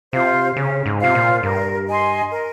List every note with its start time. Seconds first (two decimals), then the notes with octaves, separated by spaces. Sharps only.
0.13 C3 F4 C5 F5
0.56 C#3 C#4
0.86 G#2
1.00 C3 F4 C5 F5
1.15 A#2
1.43 G2 A#4
1.87 D#5 G#5 C6
2.31 A#4